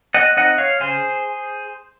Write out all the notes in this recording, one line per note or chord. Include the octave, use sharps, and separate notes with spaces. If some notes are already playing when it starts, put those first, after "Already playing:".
D#5 F#5
C4 D#4 D#5 F#5
C#5 F5
C#3 G#4 C5